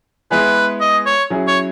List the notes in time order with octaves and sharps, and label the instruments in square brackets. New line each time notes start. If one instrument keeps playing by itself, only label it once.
[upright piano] G#3 B3 E4 G#4 [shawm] B4
[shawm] D#5
C#5
[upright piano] F#3 C#4 E4 G#4
[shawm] C#5